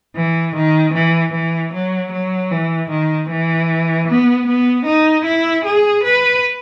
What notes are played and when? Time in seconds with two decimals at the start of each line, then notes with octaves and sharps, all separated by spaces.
0.16 E3
0.55 D#3
0.94 E3
1.33 E3
1.73 F#3
2.12 F#3
2.51 E3
2.90 D#3
3.30 E3
4.08 B3
4.47 B3
4.86 D#4
5.25 E4
5.65 G#4
6.04 B4